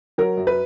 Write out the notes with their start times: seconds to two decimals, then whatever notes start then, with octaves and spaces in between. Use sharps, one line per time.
0.18 F#3 A#4
0.37 F#2
0.47 B4